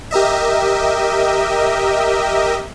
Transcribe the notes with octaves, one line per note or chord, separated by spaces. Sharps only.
G4 A#4 D#5 E5